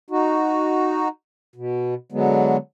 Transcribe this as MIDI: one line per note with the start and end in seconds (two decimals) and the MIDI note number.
0.10 1.08 63
0.10 1.08 66
1.56 1.94 47
2.12 2.57 50
2.12 2.57 54
2.12 2.57 56
2.12 2.57 59